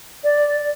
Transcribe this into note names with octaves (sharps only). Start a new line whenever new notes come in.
D5